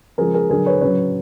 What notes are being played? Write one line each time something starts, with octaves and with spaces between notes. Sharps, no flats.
C#3 F3 G#3 G#4 A#4
G#4 A#4
D3 F#3 G#4 A#4
B4 C#5
C#3 F#3 B4 C#5